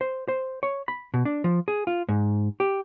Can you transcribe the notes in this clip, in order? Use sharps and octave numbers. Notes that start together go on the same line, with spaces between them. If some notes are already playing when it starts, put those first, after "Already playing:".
C5
C5
C#5
B5
B2
D4
F3
G#4
F4
G#2
G4